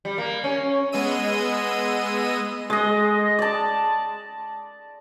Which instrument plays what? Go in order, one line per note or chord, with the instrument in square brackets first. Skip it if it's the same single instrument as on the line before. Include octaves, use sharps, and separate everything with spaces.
[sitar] G3
A#3
C#4
[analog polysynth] G#3 B3 G#4 D#5 E6 D#7
[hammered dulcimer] G#3 D#5
D5 A5